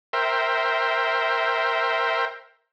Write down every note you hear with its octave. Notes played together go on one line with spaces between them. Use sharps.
A#4 C5 E5 G5